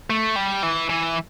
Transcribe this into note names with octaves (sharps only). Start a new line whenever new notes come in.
A3
G3
E3
E3